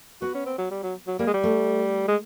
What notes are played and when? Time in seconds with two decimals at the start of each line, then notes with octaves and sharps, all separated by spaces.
0.22 B3 F#4
0.35 C#4
0.46 C4
0.58 F#3
0.71 G3
0.83 F#3
1.07 F#3
1.19 G3 A#3
1.27 G#3
1.34 G3
1.43 A3
2.08 G#3